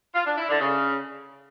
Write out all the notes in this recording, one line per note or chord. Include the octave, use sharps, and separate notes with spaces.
F4
D4
E4
D3
C#3